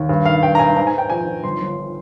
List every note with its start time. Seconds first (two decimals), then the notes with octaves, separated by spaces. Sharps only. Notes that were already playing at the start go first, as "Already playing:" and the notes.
Already playing: D#2
0.09 G2
0.25 D#3 F5
0.43 G2 G5
0.55 A#5
0.59 G2 G#5
0.76 G#2 A#5
0.87 G#5
0.93 G#2 G5
1.10 F3 G#5
1.27 F3
1.44 G1 C6
1.61 G1